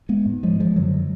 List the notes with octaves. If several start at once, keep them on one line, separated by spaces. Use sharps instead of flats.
G#3 B3
G#2
F3 G#3
F3 G#3
F#2 D3 F#3